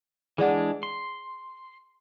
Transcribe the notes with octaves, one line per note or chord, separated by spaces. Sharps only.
E3 G#3 D4 G#4 D5 F#5
C6